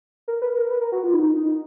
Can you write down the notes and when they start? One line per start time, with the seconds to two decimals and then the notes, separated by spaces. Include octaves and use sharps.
0.28 A#4
0.42 B4
0.56 A#4
0.71 B4
0.81 A#4
0.92 F#4
1.03 F4
1.13 D#4
1.36 D#4